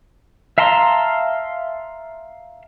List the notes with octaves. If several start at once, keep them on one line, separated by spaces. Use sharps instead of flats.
E5 F5 A5 A#5 C6